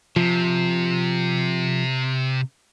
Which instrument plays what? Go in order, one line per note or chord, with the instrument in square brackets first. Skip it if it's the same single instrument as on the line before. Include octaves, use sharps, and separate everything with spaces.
[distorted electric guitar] C3 [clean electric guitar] F3